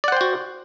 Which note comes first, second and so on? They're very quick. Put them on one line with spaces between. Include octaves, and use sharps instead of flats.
D5 F#5 C5 G5 F#4